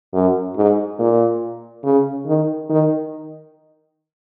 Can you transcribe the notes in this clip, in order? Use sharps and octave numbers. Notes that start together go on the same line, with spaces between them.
F#2
G#2
A#2
C#3
D#3
D#3